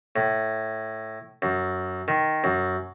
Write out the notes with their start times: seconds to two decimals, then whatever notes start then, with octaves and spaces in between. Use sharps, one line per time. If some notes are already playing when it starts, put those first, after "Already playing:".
0.16 A2
1.42 F#2
2.08 D#3
2.44 F#2